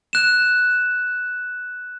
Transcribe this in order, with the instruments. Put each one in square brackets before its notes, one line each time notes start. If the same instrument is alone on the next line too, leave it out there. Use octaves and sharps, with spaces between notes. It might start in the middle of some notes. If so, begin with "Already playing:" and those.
[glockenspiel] F#6 E7